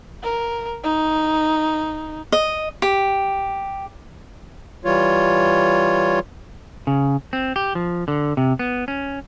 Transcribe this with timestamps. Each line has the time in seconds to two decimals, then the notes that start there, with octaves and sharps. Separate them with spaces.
0.23 A#4
0.83 D#4
2.32 D#5
2.82 G4
4.85 E3 G3 F4 C#5
6.87 C#3
7.33 C4
7.56 G4
7.75 F3
8.08 D3
8.37 C3
8.59 B3
8.88 C#4